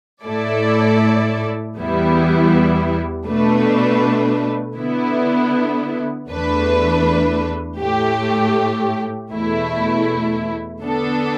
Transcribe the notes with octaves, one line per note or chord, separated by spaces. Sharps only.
A2 A3 E4 A4 D5
E2 E3 G3 B3 E4
B2 A3 D4 B4
D3 B3 E4
E2 E3 A3 D4 B4
A2 A3 G4
E2 B2 A3 E4
D3 B3 D4 A4